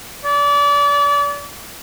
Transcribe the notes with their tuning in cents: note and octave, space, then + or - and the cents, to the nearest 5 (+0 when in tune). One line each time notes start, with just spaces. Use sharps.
D5 -35